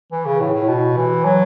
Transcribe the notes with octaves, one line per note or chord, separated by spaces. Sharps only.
E3
C#3
A2
A2
B2
E3
F#3